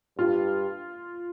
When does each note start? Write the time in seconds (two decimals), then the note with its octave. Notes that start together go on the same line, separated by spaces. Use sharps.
0.18 G2 F4